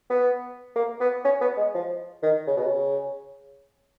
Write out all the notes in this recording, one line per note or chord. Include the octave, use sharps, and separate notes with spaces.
B3
A#3
B3
C#4
B3
G#3
F3
D#3
C#3
B2
C#3